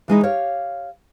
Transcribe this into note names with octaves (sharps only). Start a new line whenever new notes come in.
E3 G#3 D#4 E4
G4 C#5 F5